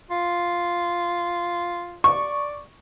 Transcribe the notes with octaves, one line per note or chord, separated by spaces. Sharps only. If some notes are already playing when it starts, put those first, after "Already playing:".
F4
D5 C#6